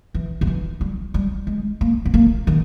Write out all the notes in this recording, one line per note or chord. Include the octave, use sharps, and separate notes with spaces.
E3
D#3
E3
G3
G3
G#3
A#3
B3
A#3
D#3